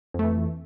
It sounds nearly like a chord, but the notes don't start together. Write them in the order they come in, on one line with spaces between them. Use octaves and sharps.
F2 A3 E3